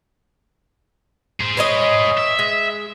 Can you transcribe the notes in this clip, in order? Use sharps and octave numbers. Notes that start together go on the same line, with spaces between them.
G#4 C5
B4 C#5 D#5
E5
G#3